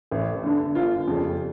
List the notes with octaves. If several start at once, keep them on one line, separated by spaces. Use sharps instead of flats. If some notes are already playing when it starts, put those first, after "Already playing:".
A1
G2 D3
G1 F4
F2 C#3 G3